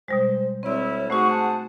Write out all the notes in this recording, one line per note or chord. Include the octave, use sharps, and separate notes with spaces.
B2 G3 G#3 C5
D2 G3 C4 E4 C#5 D5
A3 D#4 F#4 G#4 C5 F#5 C#6
A5